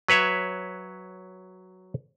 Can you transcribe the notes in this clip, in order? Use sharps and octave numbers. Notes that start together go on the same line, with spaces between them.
F#3 B4 C#5 E5